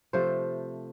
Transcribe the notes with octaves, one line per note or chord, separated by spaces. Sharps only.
C3 F3 A3 C5